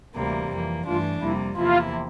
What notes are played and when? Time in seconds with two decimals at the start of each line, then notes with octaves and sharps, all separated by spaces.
0.16 D2 C3 E3 G3 A#3
0.51 F2 E3 A#3
0.86 G2 E3 A3 D4 F4
1.22 F2 C3 G3 A#3 E4
1.57 E2 C3 F3 A#3 E4 F4